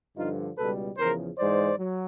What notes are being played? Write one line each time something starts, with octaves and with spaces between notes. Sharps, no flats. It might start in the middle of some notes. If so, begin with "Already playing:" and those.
G2 D3 F3 D#4 F4
C#2 B2 G3 A4 B4
E2 C#3 F3 A#4 C5
G#2 E3 G#3 C5 D5
F#3